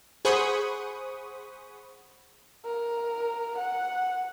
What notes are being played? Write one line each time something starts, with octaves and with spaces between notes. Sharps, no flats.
G#4 C5 F#5 B5 C#6 D#6
A#4
F#5